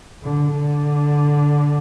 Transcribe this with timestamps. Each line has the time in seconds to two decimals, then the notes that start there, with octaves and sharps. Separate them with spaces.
0.24 D3
0.54 D3